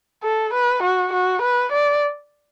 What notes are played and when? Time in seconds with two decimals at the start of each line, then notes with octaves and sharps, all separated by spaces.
0.24 A4
0.54 B4
0.83 F#4
1.13 F#4
1.42 B4
1.72 D5